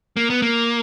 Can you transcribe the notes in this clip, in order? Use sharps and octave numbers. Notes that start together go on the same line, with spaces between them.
A#3
B3
A#3